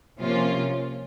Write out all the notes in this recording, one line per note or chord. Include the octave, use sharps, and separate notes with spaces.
C3 F3 A#3 C#4 F4